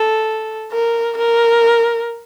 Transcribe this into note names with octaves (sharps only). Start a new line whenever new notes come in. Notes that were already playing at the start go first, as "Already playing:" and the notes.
Already playing: A4
A#4
A#4